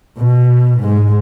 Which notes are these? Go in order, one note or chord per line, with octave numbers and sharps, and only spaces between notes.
B2
G#2 G#3